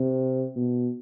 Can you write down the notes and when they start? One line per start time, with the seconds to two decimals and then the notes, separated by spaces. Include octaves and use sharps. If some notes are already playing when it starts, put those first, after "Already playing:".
Already playing: C3
0.56 B2